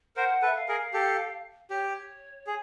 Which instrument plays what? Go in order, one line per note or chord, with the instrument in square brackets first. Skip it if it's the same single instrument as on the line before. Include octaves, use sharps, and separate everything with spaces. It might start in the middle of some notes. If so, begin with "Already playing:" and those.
[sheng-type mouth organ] A#4 C5 [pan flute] F#5
[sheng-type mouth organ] A4 B4
[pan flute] E5
F5
[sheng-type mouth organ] G#4 A#4
G4 A4
[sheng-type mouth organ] G4 [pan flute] C#5
[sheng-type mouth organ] G#4